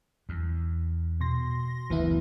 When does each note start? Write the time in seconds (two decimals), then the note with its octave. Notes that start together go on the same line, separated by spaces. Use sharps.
0.29 E2
1.20 B2 C6 A#6
1.90 F#1 D2 E3 B3 E4